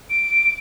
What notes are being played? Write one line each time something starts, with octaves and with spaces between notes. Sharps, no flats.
D7